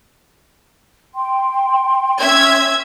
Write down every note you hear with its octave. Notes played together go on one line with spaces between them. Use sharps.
G5 C6
C#4 E5 G#6